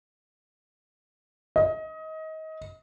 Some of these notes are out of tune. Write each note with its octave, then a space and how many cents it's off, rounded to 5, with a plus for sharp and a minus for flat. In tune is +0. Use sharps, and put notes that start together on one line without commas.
D#5 +25